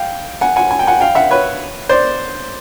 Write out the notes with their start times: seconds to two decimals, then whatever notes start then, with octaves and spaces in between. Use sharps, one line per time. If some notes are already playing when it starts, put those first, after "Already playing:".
Already playing: F5 G5
0.41 F#5 G#5
0.56 F#5 G#5
0.71 G#5
0.79 G5
0.87 F#5 G#5
1.01 F5 G5
1.15 E5 F#5
1.31 B4 C#5
1.89 C5 D5